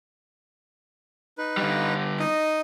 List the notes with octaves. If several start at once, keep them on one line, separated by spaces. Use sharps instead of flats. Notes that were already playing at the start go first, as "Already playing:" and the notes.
D#4 B4
D3 G3
D#4 D#5